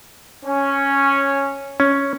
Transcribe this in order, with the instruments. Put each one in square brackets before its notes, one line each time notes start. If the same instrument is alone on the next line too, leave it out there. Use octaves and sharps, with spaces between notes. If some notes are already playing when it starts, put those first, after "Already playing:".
[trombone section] C#4
[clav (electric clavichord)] C#4